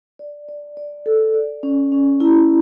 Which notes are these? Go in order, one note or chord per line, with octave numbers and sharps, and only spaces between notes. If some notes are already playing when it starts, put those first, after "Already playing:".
D5
D5
D5
A4
D5
C#4
C#4
E4